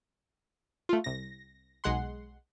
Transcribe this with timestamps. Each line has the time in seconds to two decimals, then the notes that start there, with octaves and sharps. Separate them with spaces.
0.89 A3 F4
1.04 C2 A#6
1.84 B1 G#3 F#5 C6